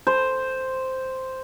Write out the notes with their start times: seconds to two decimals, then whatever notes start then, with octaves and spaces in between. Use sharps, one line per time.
0.07 C5